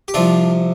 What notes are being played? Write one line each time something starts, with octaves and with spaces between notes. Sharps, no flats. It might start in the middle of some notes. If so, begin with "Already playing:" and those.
G4
C2 C3 F3 D4 F4